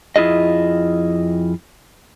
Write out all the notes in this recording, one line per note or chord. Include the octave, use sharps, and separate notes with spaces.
F2 E4 F4 G#4 D#5